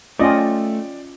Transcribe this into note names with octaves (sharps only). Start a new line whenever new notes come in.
A3 C#4 F4 D5 D#5 G5